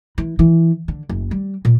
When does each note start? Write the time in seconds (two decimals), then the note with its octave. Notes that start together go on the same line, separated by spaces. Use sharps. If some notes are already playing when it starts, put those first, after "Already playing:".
0.18 E3
0.39 E3
0.88 D3
1.09 F#1
1.31 G3
1.65 A#2